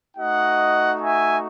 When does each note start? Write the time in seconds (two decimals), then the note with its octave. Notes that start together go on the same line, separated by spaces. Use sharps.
0.16 A3 D#4 F#4 D#5 F#5
1.00 E5 G#5